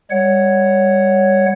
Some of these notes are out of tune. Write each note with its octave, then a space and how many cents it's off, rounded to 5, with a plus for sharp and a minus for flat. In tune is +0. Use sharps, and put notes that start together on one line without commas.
G3 +30 C#5 +0 F#5 +5